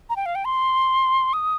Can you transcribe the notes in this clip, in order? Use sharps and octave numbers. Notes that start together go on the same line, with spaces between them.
A#5
G5
F5
G5
C6
D#6